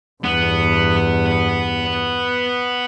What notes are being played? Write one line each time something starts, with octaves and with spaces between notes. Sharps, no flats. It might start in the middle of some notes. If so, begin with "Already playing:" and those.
E2 G2 B3